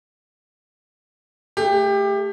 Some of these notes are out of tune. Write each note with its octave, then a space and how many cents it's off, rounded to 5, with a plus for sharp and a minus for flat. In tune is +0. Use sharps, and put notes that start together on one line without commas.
A3 +0 G4 +25